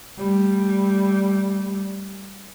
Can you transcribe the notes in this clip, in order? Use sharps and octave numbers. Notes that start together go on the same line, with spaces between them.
G3 A3